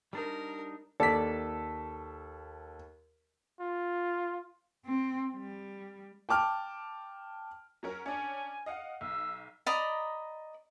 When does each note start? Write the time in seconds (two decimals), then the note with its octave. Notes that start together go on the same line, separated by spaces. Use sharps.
0.13 G3 D4 D#4 A#4
1.00 D#2 A4 D5 B6
3.61 F4
4.85 C4
5.36 G3
6.29 G5 A5 D6 F6
7.83 F#3 C#4 A#4
8.06 C#4 D4 G#5
8.66 D#5 F5 F#5
9.01 B1 E6
9.66 D5 D#5 A#5 B5